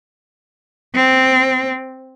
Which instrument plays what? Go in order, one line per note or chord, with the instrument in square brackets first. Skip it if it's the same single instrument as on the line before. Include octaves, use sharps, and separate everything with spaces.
[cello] C4